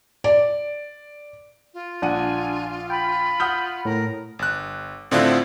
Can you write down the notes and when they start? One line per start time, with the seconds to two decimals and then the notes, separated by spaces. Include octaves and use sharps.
0.24 D5
1.74 F4
2.02 A#1 D4 F#5 G#5 D#7
2.90 G5 B5
3.40 F#5 D#6 F6 G6
3.85 A2 A#4
4.39 G1 F#6
5.11 A2 D3 C4 D4 E4 F4